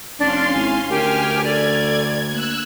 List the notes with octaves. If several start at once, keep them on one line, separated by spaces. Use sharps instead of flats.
F1 C#4 D4 F5 C6
G#1 E4 G#5
D2 G4 A#4 G#5 F6
A4 D5 G#6
A#3 E6 F#6